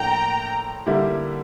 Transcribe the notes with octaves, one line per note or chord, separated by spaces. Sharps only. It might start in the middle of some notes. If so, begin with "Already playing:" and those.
Already playing: A2 F3 A#3 D4 G5 A#5
D3 G3 A#3 E4 G4